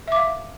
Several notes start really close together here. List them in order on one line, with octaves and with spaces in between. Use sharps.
E5 D6 F5